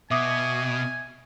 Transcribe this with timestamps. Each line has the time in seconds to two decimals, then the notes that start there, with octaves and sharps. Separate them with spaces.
0.11 B2 E5 G#5 D6 D#6